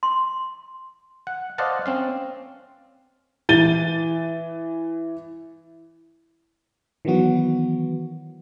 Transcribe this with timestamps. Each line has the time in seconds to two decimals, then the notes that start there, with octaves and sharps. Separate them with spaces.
0.03 C6
1.27 F#5
1.58 C5 D5 D#5 F5 F#5 A5
1.86 C4 C#4 F5
3.49 E3 A6 D#7 G7
7.05 D#3 E3 F#3 B3 F#4